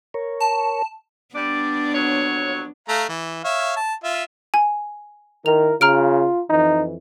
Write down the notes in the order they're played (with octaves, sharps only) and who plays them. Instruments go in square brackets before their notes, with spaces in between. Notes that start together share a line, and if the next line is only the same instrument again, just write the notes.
[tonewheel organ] A#4 C#5
[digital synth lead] A5
[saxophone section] G3 D5 [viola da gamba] B3 D4
[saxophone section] F2 F#3 C#5
[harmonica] A3 F5 A#5
E3
C#5 E5 F5
A5
F4 E5
[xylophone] G#5
[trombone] D#3 [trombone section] E4 A#4 [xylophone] F7
[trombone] C#3 [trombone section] F4 [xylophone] A#5 F6 D7
[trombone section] F2 E3 [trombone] D#4